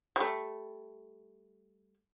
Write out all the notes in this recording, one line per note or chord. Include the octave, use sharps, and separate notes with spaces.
G3 A3